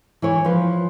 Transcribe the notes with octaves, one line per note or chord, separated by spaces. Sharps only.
E3 E4 C#5
F3 B4